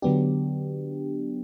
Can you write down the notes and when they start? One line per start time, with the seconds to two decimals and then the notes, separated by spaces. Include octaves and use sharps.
0.02 D3 F#3 B3 D4 G4